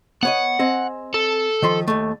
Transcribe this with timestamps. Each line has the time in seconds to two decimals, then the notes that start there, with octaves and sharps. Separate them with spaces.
0.23 B3 C#5 D#5 F#5
0.59 C4 G#4 D#5
1.14 A4
1.62 D#3 F3 C6
1.88 D#2 A3